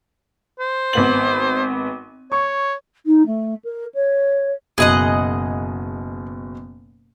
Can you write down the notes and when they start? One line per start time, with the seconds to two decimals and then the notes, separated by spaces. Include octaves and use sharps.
0.59 C5
0.93 G#1 B3 F#7
2.32 C#5 C#6
3.06 D#4
3.26 A3
3.64 A#4
3.94 C#5
4.78 F#1 B2 G#4 D#5 F#5